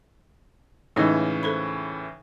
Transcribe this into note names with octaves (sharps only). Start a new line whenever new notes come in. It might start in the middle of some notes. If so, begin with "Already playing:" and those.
A2 C#3 E3 G#3 D#4 D#5
A4 C5 B5